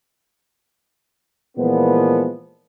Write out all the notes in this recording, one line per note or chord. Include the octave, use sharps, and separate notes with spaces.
A#2 E3 F3 G#3 B3